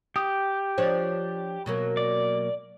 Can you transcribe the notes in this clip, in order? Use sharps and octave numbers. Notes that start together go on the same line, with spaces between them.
G4 D#6
F3 D4 C5 C#5
B2 F#3 A#3
D5